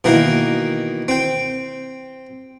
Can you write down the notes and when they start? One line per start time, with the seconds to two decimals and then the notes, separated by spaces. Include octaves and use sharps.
0.04 B2 D#3 E3 A#3
1.08 C4 G5